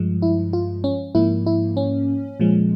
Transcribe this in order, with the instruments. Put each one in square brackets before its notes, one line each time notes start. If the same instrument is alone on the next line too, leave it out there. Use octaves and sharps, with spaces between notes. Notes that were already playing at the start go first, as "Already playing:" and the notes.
Already playing: [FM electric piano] G2 F3 G#3
E4
F4
C#4
G#2 F3 A#3 E4
E4
C#4
A#2 F3 G#3